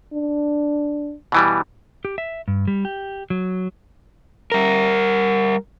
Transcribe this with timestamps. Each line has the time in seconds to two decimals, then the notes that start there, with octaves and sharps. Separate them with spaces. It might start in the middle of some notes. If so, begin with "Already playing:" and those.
0.14 D4
1.32 B2 E3 G3
2.05 G4
2.18 E5
2.48 G2
2.68 G3
2.85 G4
3.30 F#3
4.52 G3 A#4